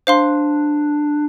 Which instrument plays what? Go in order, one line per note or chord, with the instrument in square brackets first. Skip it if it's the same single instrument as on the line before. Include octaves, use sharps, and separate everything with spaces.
[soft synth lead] D4 [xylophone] C5 F5 C6